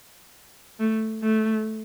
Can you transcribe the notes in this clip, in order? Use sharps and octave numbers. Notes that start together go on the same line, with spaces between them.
A3
A3